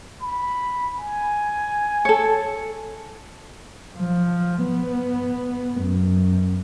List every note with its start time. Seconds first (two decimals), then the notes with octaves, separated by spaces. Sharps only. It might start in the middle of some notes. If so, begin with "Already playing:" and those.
0.20 B5
0.98 G#5
2.05 A4 C#5
3.97 F3
4.64 B3
5.81 F#2